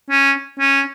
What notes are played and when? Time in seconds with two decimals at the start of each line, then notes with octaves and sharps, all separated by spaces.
0.10 C#4
0.59 C#4